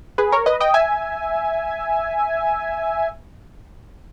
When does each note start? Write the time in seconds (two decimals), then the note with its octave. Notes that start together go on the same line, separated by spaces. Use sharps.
0.18 G#4 B4
0.32 A#4 C#5
0.46 B4 D#5
0.60 D#5 G5
0.74 E5 G#5